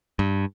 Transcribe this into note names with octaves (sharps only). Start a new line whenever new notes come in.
G2